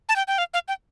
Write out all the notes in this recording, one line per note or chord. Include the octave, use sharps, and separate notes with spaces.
A5
G5
G5
F5
F5
G5